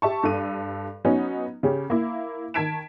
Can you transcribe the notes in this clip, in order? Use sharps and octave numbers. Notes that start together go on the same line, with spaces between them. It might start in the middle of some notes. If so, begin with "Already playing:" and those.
G4 E5 A5 C#6
G2 A4 D#7
F#3 B3 C#4 D#4
C#3 C#4 G4
A#3 E4
D#3 A5 G#6 B6 D7 E7